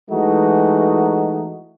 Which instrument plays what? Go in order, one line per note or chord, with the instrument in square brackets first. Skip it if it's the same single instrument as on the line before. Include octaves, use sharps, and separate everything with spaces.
[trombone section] E3 G#3 A3 D#4 F#4